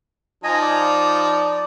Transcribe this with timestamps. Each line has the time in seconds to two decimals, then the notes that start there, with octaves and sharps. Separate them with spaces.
0.44 F3 D#4 D#5 G#5
0.61 D5